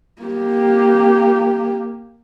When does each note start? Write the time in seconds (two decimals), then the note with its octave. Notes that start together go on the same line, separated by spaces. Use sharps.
0.22 A#3 G4